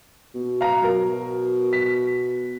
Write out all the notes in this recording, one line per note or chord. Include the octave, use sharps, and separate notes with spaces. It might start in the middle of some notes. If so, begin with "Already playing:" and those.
B2
F5 A#5
F#3 A#4
B6